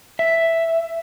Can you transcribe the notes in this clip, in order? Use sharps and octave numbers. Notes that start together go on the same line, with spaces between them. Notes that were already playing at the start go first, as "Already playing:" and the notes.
E5